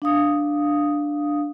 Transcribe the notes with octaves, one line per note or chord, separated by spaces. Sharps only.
D4 F5 D#6